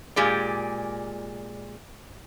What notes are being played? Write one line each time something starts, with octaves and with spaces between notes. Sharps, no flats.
A#2 G#3 G4 G#4 D5